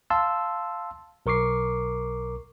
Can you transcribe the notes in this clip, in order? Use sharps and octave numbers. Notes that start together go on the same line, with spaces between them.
F5 A5 C6 E6
B1 A#4 C#6 D6 C7